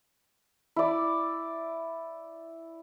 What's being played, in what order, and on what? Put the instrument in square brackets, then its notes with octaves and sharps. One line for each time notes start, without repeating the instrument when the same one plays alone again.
[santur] E4 D5